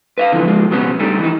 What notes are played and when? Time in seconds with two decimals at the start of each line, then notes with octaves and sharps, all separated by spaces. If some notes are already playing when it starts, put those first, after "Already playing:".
0.18 B4 E5 F5
0.32 D3 E3 F3
0.46 F3 G#3
0.71 B1 C#3 F#3 B3 C#4
0.99 G3 A3 D4 D#4
1.19 E3 D#4